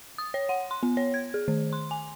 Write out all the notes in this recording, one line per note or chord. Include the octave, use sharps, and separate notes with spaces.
D#6
C#5
F#5
C6
B3
C#5
G#6
G#4
D#3
C6
G#5